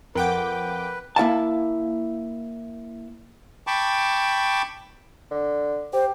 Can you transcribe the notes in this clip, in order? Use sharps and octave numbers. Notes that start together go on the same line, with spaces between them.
F2 A#4 B4 F#5 G5 D6
A#3 E4 F5 A5
G5 A5 B5 C#6 D6
D3
G4 C5